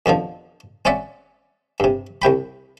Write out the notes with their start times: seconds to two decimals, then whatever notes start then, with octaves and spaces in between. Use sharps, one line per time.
0.06 F2 B2 D3 F3
0.85 C4 C#4 C#5 D5 E5 F#5
1.80 G2 C3
2.22 C2 C3 G5 B5